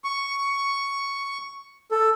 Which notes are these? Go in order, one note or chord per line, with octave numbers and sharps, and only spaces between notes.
C#6
A4